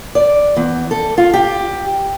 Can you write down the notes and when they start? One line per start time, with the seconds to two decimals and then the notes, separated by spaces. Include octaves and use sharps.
0.15 D5
0.57 E2
0.91 A4
1.18 F4
1.34 G4